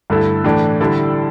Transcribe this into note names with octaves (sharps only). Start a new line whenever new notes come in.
G2 D3 A3 E4 A4
A2 E3 A3 D4
D3 G3 E4 A4 D5